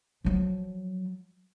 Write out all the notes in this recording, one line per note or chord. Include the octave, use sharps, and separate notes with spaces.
F3 F#3